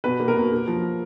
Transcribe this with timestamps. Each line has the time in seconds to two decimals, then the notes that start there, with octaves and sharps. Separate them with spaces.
0.04 B2 B4
0.20 A#3
0.28 A#4
0.36 B2
0.52 A#3
0.68 F3